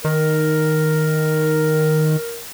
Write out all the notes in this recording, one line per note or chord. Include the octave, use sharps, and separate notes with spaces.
D#3 A#4